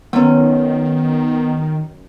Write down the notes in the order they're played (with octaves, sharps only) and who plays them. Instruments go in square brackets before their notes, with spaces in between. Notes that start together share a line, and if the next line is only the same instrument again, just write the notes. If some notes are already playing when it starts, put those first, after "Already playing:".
[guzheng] F#2 C#4 [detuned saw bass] D#3 [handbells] B3